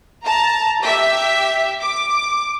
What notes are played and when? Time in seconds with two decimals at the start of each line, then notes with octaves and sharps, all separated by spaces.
0.23 A5 A#5
0.83 G4 E5
1.80 D6